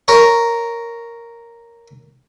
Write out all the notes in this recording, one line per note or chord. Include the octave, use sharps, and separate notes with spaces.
A#4 C#5